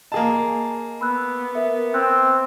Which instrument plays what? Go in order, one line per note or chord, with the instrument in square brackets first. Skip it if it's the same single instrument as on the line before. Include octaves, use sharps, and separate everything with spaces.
[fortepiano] A#3 G#4 A5 [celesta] D#5
[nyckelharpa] B3 [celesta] B5 E6 F#6
[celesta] A#4 E5
[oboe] C4 [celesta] F#6